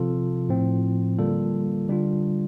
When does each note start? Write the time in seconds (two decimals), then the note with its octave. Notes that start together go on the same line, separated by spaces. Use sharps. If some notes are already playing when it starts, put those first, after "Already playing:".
Already playing: C3 F3 C4 F4 A4
0.49 A2 F3 C4
1.18 D3 G3 A#3 F4 A4
1.88 D3 G3 D4 F4